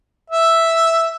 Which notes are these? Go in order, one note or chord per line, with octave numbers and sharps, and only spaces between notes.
E5